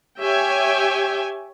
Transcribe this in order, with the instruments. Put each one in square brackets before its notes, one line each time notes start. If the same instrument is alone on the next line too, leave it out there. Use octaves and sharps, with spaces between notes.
[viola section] G4 C#5 E5 G5 G#5